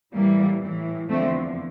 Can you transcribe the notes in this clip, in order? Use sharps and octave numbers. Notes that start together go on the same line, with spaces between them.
A2 E3 G3 A#3
A2 E3
E2 D3 F3 A3 C4